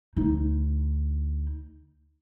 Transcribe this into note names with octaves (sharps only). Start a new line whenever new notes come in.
D2 D#4